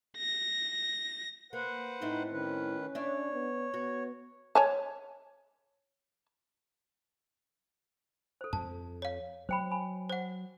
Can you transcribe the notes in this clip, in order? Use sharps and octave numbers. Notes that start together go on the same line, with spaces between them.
A#6
A#3 B4 C5 F#5
A2 C4 D#4 E4
D#3 C#4 B4
D4 C#5 E5
B3
B3 F#4
C#5 G#5 A5
A4 C5
F2 A5
C#5 F5
F#3 C5 G5 B5
G#5 B5
C5 F#5